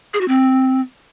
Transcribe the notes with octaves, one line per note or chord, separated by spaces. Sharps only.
G#4
F#4
C4